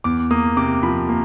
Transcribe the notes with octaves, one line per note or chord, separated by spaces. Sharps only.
E2 D6
A#3 D#6
C3 D6
F3 B5
A#3